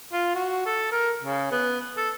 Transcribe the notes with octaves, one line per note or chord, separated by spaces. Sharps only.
F4
F#4
A4
A#4
C#3
B3
A4